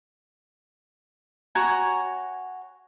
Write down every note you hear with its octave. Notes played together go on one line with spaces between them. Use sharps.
F#4 C#5 G#5 A#5